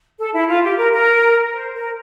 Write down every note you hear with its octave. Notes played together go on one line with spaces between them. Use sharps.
A4
E4
F4
G4
A#4
A#4
C5
A#4